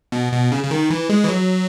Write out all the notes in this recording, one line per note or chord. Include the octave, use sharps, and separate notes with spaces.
B2
B2
C#3
C#3
D#3
E3
G#3
E3
F#3